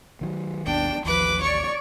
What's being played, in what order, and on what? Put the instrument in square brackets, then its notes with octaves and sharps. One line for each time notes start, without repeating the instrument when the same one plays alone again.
[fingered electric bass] D#3 E3 F#3
[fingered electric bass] G#1 D#2 B2 [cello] D4 [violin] G5
[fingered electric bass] A1 D#2 [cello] F3 [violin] B4 D6
[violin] C#5 C#6 [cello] D5